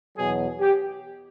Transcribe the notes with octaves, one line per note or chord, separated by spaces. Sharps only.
E2 B2 F#3 G#4
G4